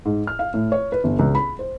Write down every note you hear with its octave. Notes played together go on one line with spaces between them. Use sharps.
G#2
F6
F5
A2
C#5
B4
G1
C#2
B5
C5